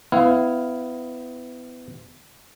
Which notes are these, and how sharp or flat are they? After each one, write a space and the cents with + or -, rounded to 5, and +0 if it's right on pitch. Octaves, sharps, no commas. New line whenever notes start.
B3 +30 E4 +0 F5 +0